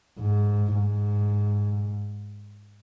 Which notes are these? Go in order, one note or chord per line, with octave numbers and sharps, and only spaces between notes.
G#2
G#2